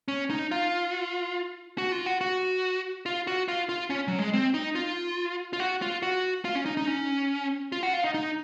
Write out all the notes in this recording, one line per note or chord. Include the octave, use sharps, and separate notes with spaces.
C#4
D#4
F4
F#4
F4
F#4
F#4
F4
F#4
F4
F4
C#4
F#3
G#3
C4
D#4
F4
F4
F#4
F4
F#4
F4
C#4
D#4
D#4
C#4
F4
F#4
F4
D#4
D#4